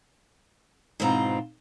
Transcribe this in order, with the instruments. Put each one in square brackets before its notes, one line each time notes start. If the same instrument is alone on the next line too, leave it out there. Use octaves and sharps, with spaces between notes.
[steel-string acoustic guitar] G#2 B2 E3 C4 F4 A#5